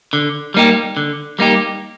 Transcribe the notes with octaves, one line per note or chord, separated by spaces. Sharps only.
D3
G3 A#3 D#4 G4
D3
G3 A#3 D#4 G4